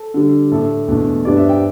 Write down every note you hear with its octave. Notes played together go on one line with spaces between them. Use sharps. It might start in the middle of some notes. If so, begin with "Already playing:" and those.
Already playing: A4
D3 G3 D4
A2 A3 D4 A4
E2 B2 A3 D4
G2 G3 B3 D4 D5
E5
G5